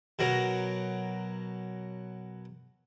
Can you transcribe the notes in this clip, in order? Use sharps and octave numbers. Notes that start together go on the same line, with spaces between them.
B2 F#3 A#4 A#5